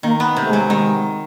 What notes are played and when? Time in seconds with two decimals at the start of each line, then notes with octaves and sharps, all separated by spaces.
0.03 D#3 A#3
0.20 B3
0.37 C3 A3
0.50 F#3 G#3
0.68 D#3 G#3